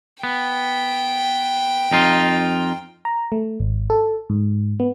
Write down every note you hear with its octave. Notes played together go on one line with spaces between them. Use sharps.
B3 G5
F2 D#4 F4
A#5
A3
G#1
A4
G#2
B3